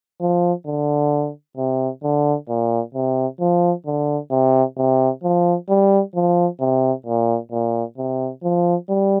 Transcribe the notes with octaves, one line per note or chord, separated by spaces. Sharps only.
F3
D3
C3
D3
A#2
C3
F3
D3
C3
C3
F3
G3
F3
C3
A#2
A#2
C3
F3
G3